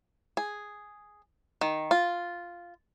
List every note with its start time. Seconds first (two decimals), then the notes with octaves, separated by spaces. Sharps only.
0.37 G#4
1.61 D#3
1.91 F4